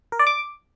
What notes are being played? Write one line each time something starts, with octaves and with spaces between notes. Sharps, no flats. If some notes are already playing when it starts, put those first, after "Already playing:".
A#4
D5
D6